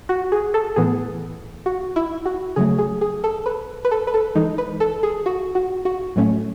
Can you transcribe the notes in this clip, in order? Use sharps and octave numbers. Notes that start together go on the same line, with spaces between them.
F#4
G#4
A4
A2 E3 B3 G#4
F#4
E4
F#4
C#3 F#3 A3 G#4
G#4
G#4
A4
B4
B4
A4
B4
A4
E3 G#3 D#4
B4
A4
G#4
F#4
F#4
F#4
A2 F#3 A3 C#4